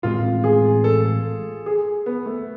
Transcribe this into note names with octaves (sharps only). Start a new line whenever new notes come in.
A1 A2 G#3 C4 F4
G#4
A4
G#4
B3
A3